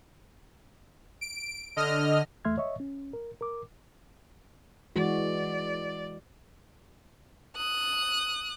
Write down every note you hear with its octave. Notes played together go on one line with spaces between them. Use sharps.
D7
D3 D#5 F6
E2 A3 E5 C6 F6 G#6
C#5 D#5 E5 C#6
C#4
A#4
A#4 D6
E3 G#3 F#4 D5
D#6 F#6